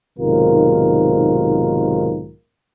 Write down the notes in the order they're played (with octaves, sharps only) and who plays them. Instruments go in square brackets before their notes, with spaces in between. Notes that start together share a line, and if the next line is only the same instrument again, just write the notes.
[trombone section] B1 G#2 C3 D#3 F4 A#4